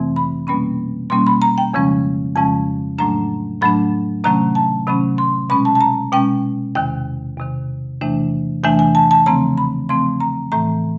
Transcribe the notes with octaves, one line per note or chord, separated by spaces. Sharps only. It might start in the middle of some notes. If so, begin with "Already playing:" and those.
Already playing: F2 C3 E3 A3 C4
B5
B2 G3 A#3 C#4 B5
B2 G3 A#3 C#4 C6
B5
A#5
G5
F2 C#3 F3 G#3 C#4
F2 C#3 F3 G#3 C#4 A5
A2 F#3 A3 D4 A#5
A2 F#3 A3 D4 B5
C3 D#3 F#3 A3 C#4 A#5
A5
C3 D#3 F#3 A3 C#4 B5
C6
B2 G#3 C#4 B5
A5
A5
A#5
B2 G#3 C#4 G5
E2 C3 D#3 G5
E2 C3 D#3
E2 C3 E3 A3 D4
E2 C3 E3 A3 D4 G#5
G#5
A5
A5
C#3 F3 A3 C4 A#5
B5
C#3 F3 A3 C4 C6
A#5
A2 E3 A3 A#5